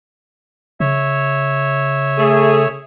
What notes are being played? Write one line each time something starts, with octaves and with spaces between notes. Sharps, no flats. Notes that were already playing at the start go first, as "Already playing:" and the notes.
C#3 C#5 E5
A3 G#4